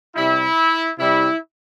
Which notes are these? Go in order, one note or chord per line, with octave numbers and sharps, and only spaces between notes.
C3 G3 E4
C3 G3 E4